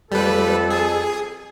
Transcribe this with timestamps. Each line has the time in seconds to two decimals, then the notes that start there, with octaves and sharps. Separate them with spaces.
0.12 F2 G3 A4 B4
0.70 G#4